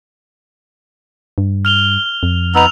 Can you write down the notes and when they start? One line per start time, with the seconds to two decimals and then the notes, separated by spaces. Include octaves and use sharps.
1.38 G2
1.65 F6 F7 G7
2.23 F2
2.55 B3 D#4 E6 F7